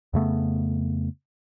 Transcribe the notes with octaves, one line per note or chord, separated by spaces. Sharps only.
F2 C#3 A3 B3